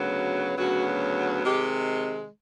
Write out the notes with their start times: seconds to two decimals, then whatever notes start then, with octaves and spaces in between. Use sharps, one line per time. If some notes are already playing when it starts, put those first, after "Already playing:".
Already playing: D2 C#3 F#3 B3
0.57 D2 C#3 F#3 B3 F#4
1.44 C3 D#3 G#3 G4